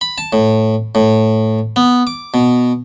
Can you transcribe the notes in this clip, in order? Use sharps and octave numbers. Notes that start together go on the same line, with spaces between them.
B5
A5
A2
A2
B3
D6
B2